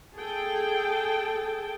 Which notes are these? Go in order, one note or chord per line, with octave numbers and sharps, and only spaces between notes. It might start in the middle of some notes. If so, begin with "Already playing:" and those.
G#4 A4 G5 A5